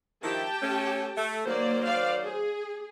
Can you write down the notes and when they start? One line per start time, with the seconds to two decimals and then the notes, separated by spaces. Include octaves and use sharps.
0.24 D#3 F3 E4 G4 G5 A5
0.62 A3 C#4
1.17 A3
1.46 D#3 F#3 A#3 C5 D5
1.85 D5 F5
2.24 G#4